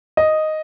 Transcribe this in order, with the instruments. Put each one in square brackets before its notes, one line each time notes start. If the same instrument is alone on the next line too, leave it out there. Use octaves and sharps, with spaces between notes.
[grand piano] D#5